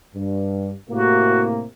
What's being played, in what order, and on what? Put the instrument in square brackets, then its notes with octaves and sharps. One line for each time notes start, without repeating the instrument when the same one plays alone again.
[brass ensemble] G2
[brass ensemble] A2 C3 A#3 [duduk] F#4